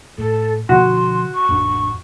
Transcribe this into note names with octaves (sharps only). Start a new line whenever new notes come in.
A2 A4
B2 D3 F3 F#4 C6
C#6
A1 F2 D4